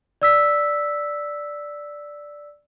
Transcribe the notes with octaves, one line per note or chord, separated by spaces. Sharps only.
D5 E6 B6